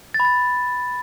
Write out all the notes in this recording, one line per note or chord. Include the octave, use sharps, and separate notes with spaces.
A6
B5
A6